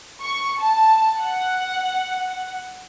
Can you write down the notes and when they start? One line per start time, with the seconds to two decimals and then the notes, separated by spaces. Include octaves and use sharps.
0.22 C#6
0.61 A5
1.19 F#5